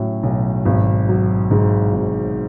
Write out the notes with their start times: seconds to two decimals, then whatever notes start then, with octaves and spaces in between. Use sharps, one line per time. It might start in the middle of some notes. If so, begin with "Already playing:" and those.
Already playing: A2 F#3 C#4
0.23 B1
0.66 G#1
1.09 F#3
1.51 G#2
1.93 G#1